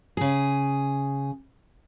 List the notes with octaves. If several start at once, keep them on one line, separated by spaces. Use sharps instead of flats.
C#3 G#4